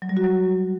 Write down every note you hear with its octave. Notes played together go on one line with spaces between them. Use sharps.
F#3
G3
F#4
F#3